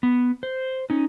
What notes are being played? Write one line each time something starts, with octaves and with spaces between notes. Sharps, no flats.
B3
C5
C#4 D#4